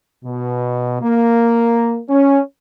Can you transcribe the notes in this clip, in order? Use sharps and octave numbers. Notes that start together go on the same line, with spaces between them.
B2
A#3
C#4